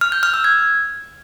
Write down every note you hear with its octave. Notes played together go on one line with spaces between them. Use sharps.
F6
G6
F6
E6
G#6